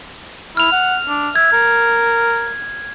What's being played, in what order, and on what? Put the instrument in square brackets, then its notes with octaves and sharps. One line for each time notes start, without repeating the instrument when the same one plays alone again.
[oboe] E4 [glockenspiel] F6 F7
[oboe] F#5
D4
[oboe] E5 [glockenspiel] G#6
[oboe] A#4